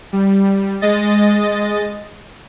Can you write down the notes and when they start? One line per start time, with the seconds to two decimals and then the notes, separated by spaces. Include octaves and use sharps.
0.13 G3
0.81 G#3 D#5 A6